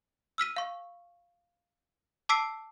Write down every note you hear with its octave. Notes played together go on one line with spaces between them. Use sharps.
E6 F6 B6 D#7
F5 C#6
A5 D6 E6 B6 C7 D7